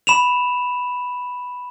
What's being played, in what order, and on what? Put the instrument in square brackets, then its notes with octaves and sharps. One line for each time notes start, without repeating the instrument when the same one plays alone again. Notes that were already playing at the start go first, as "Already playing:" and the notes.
[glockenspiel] B5 E7 F7